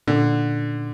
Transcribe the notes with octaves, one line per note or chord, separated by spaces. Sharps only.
A#2 D3